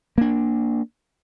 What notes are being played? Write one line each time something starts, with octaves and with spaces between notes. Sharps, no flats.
A#3 D4